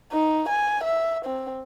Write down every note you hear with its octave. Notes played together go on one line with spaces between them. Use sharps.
D#4
G#5
E5
C4